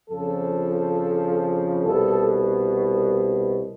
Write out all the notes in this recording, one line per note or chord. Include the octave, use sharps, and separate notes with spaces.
F2 C#3 F3 A4
C2 B2 A4